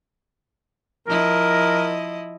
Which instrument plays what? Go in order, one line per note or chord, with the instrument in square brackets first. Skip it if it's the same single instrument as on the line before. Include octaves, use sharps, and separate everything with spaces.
[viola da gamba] F3 E4 D#5 [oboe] A#4